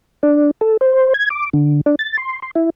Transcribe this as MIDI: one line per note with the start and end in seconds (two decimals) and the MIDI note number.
0.23 0.51 62
0.61 0.77 69
0.81 1.13 72
1.14 1.29 92
1.30 1.49 86
1.53 1.81 50
1.86 1.95 62
1.99 2.17 93
2.17 2.40 84
2.42 2.51 84
2.55 2.70 64